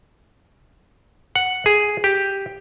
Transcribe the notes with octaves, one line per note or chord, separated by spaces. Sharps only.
F#5
G#4
G4